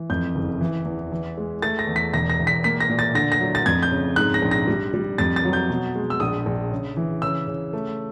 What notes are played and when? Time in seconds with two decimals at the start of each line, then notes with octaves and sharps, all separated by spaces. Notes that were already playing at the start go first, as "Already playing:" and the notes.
Already playing: E3
0.10 F2 G6
0.35 F#1
0.61 E3
0.85 E2
1.11 E3
1.37 G#3
1.62 A3 A6
1.79 A#6
1.87 E2
1.96 B6
2.13 E1 A#6
2.30 A#6
2.39 E1
2.47 B6
2.64 A#3 B6
2.80 A#6
2.89 A#2
2.99 A6
3.15 D3 A#6
3.32 A#6
3.40 F#3
3.55 A6
3.66 F2 G#6
3.83 G6
3.92 C#3
4.16 G#2 F#6
4.34 A#6
4.42 A#1
4.51 A#6
4.67 G3
4.94 G3
5.18 F2 A6
5.36 A6
5.45 F#3
5.53 G6
5.70 B2
5.95 G#3
6.10 E6
6.20 A#1 D#6
6.46 A#1
6.72 C#3
6.97 E3
7.22 C#3 E6
7.47 C#3
7.73 A3